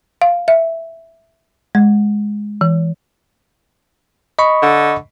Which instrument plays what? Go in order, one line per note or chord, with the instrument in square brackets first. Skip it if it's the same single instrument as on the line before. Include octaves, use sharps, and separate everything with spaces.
[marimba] F5
E5
G#3
E3
[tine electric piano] D#5 B5 C#6
[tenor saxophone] D3